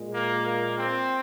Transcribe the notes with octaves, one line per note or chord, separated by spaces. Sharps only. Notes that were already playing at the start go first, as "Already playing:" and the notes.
Already playing: A#2 G#3
A#3
A#3
C4